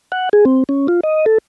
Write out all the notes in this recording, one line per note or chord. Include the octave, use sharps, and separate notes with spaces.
F#5
G#4
C4
C#4
F4
D#5
A4